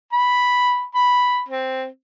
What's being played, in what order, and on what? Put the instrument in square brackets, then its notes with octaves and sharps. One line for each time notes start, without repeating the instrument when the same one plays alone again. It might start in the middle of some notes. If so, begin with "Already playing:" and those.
[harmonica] B5
B5
C4